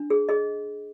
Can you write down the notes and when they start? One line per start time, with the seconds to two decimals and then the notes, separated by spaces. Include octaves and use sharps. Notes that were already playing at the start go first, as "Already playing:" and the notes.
Already playing: D4
0.10 G#4
0.29 G#4 D#5